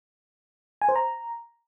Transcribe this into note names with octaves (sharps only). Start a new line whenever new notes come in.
G#5
C5
A#5